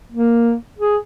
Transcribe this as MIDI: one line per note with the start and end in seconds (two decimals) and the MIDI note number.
0.12 0.54 58
0.79 0.96 68